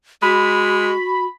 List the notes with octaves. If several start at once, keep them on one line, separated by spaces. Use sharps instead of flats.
G#3 F#4 B5